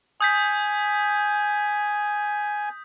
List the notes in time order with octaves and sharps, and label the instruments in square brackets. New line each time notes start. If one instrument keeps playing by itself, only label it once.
[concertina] G#5 [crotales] D#6 G6 B6